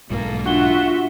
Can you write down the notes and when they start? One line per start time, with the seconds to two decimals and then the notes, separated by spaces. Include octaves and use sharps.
0.10 B1 G#2 A#3 A4
0.46 D4 F4 F#4 E5 G7